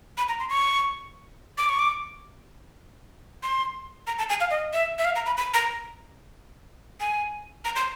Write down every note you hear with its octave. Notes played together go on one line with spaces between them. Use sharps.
B5
A#5
C6
C#6
D6
C#6
D6
C6
A#5
A5
G#5
F5
D#5
E5
E5
F5
A#5
B5
B5
A#5
G#5
A#5
C6